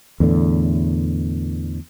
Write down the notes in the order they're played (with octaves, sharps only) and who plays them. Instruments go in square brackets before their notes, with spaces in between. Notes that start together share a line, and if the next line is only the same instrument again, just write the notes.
[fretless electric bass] E2 A2 D3